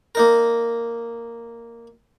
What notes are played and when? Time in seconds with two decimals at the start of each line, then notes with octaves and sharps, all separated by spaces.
0.15 A#3 D#4 A#4